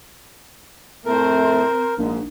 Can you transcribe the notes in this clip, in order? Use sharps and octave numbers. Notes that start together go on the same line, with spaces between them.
F2 A2 A3 C4 A#4 C5
A#1 G#2